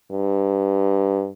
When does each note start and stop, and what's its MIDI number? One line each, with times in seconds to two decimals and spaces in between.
0.11 1.29 43